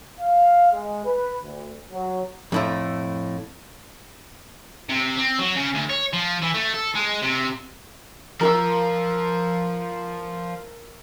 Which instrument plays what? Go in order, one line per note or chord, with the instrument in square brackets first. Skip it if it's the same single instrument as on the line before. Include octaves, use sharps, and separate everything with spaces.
[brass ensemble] F5
G#3
B4
D2
F#3
[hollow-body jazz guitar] F2 A2 A3
[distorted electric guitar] C3
C4
F#3
C#3
D2
C#5
F3
E3
A3
A4
G#3
C3
[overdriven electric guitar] F3 [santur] A#4 A#5 E6